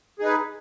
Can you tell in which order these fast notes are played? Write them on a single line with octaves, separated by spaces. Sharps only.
G#4 D#4 B4